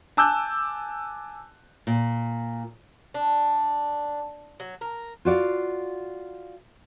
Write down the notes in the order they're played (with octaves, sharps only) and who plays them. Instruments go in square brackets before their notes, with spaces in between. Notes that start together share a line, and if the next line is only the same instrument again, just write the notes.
[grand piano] G#5 A5 D6 E6 F#6 G6
[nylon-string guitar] A#2
[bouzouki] D4
F#3
A#4
[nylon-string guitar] F4 F#4 D5 F5